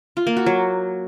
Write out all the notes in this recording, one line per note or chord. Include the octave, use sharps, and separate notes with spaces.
F4
A#3
F#4
F#3